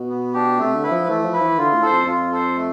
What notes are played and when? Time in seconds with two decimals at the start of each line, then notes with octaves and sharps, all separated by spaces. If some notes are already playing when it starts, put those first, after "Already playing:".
Already playing: B2
0.09 B3
0.34 D4 G4
0.59 C3 A3
0.75 D3
0.83 E4 B4
0.91 F3
1.08 E3 A3
1.25 F3
1.33 E4 B4
1.41 E3
1.58 D3 F4
1.74 A2
1.82 A4 C5
1.90 F2
2.06 F2 F4
2.32 A4 C5
2.56 A3